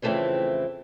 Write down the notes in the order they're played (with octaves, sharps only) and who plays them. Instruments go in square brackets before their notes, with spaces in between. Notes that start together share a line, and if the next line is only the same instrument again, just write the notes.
[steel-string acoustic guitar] F2 C#3 E3 A3 C4 E4